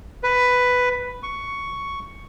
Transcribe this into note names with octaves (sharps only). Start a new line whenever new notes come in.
B4
C#6